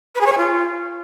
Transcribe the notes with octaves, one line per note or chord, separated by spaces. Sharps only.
B4
G#4
C#5
G#5
F4